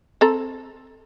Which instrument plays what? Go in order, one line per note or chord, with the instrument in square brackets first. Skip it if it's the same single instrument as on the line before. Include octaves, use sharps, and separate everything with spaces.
[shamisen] C4 A4 A#5